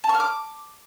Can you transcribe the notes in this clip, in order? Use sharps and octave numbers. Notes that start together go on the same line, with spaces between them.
A5
C#6
F6
D6